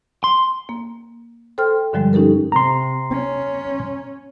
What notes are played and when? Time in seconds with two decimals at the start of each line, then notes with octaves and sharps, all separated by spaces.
0.24 C6
0.69 A#3
1.58 A4 C5 G5 C6 F6
1.93 G2 D3 F3 G3 G#3
2.13 C#4 D#4 G4 A4 A#4
2.52 C3 A#5 C6
3.11 C#4